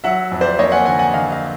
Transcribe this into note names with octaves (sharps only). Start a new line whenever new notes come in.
F#3 E5 F#5
F2
C5 D5
A#3 C#5 D#5
F#5 G#5
D3 F#5 G#5
F#5 G#5
D3 D#5 F5
D#5 F5